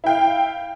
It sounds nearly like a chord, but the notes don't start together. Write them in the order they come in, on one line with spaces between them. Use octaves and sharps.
E4 G5 F5